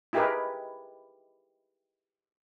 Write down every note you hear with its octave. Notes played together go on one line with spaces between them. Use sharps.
D#4 E4 G4 G#4 A#4 B4